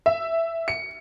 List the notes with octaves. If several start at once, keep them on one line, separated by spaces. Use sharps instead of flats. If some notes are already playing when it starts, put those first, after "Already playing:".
E5
C#7